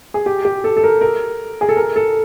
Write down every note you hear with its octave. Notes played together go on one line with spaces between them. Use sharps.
G#4
G4
G4
A4
A4
A#4
A#4
G#4
A4
A#4
A4